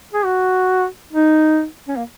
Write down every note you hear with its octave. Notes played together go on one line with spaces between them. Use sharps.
G#4
F#4
D#4
C#4
A#3